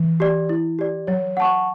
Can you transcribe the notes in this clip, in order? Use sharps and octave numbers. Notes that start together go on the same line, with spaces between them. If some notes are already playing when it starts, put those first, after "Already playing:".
Already playing: E3
G4 D5
E4
G4 D5
F#3 C#5
F#5 A5 C#6